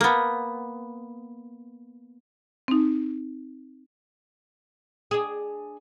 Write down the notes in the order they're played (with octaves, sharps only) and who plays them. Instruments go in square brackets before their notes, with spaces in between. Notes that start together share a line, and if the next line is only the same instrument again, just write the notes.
[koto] A#3 B3
[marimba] C4 D#4
[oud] D4 G#4